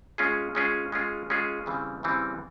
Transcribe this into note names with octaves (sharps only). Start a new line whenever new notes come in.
G#3 C#4 F4 G#4
G#3 C#4 F4 G#4
G#3 C#4 F4 G#4
G#3 C#4 F4 G#4
C#3 E3 G3 C4
C#3 E3 G3 C4